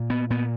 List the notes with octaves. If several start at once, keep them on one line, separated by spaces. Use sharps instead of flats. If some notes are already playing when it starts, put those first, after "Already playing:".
Already playing: A#2
B3
A#2 B3